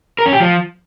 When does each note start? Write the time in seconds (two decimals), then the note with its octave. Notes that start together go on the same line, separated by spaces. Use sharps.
0.19 A#4
0.26 C#4
0.33 G4
0.40 F3